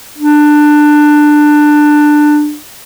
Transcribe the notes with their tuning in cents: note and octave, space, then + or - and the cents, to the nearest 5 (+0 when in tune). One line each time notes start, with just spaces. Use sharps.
D4 +15